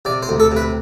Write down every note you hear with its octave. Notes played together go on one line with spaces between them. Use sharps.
C3 D5
C5
D2
A4
C3 B4